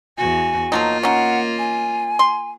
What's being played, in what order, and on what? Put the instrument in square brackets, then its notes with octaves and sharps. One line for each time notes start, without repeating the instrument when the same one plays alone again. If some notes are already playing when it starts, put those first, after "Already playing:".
[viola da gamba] E2 F#4 [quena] G#5
[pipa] F3 F#3 D#4 [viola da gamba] A#3 F4
[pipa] C#4 D#4 [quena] F#5
[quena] G#5
[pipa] C6